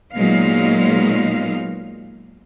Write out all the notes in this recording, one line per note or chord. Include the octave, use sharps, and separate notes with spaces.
A#2 F#3 G#3 B3 D#4 F5